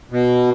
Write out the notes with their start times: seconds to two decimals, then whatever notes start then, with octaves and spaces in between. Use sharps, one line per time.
0.11 B2